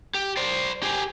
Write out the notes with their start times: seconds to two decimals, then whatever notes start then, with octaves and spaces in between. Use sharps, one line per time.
0.14 G4
0.37 C5 D5
0.83 G4 G#4